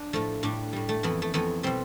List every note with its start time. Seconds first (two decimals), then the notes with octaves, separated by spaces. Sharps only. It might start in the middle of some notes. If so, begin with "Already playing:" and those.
Already playing: D4
0.13 A2 F3 A3
0.43 A2 G3 D4
0.73 A2 G3
0.89 A3
1.03 F2 E3 A3 B3
1.22 A3
1.34 F2 E3 A3 B3
1.63 B2 G3 C4